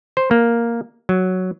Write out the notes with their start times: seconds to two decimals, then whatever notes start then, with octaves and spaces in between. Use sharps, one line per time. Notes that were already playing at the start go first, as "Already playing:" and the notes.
0.17 C5
0.31 A#3
1.09 F#3